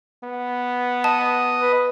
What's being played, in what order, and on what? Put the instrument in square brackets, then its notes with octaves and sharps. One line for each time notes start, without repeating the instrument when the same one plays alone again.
[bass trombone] B3
[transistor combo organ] D#5 [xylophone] A5
[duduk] B4